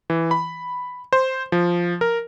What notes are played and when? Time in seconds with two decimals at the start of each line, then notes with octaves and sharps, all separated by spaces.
0.10 E3
0.31 B5
1.13 C5
1.52 F3
2.01 A#4